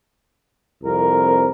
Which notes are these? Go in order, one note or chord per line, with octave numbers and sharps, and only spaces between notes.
C2 F2 A#4 C5